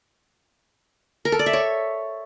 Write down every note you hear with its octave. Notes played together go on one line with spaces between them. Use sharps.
A#4
A4
D5
E5
C#5